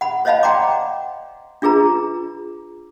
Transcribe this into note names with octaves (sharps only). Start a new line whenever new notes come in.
F#5 B5
C5 C#5 D#5 F5 A5 B5
D5 F#5 G5 A#5 C6 D6
D4 F4 G#4 B4 A#5